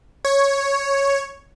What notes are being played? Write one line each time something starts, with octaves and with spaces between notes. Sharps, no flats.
C#5